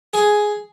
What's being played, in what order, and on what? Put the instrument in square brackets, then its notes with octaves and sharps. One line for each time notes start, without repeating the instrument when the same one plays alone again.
[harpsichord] G#4